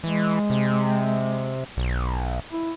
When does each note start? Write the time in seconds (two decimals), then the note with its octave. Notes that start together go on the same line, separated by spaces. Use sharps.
0.04 E3 G#3
0.50 C3
1.77 B1
2.52 E4